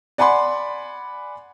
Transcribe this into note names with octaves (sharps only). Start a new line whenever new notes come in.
D5 F#5 G#5 B5 C6